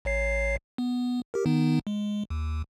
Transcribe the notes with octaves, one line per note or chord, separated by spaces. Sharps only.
A1 C#5 C7
B3
G4 A#4
D#3 B3 D#4
G#3
D#2